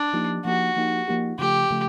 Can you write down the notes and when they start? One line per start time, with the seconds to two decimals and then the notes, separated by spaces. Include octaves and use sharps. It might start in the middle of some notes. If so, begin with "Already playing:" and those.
Already playing: D4
0.13 F3 A#3 D#4 G4
0.45 F3 A#3 D#4 F#4 G4
0.76 F3 A#3 D#4 G4
1.08 F3 A#3 D#4 G4
1.39 C#3 F3 A3 G4
1.71 C#3 F3 A3